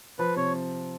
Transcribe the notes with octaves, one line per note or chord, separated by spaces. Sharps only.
F3 B4
C3 C#5